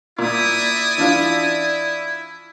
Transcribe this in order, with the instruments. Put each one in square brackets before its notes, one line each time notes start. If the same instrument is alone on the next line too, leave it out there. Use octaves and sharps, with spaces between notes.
[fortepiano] A#2 [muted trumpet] E4 [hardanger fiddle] D5 D#6
[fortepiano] E3 D4 F4